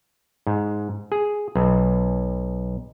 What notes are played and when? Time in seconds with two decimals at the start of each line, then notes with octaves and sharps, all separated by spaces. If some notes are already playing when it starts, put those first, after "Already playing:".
0.47 G#2
1.12 G#4
1.55 B1